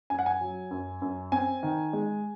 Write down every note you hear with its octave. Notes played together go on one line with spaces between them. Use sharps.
F#2 G#5
F#5
G#5
F#3
F#2
F#2
C4 G#5
D#3
G#3